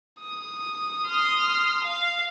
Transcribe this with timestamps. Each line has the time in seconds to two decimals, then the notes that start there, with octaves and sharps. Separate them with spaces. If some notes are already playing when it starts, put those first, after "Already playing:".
0.21 D#6
1.07 C6 F6
1.84 F5